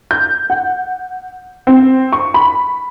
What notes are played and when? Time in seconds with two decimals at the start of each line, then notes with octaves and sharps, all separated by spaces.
0.11 G6
0.50 F#5
1.67 C4
2.13 C#6
2.34 B5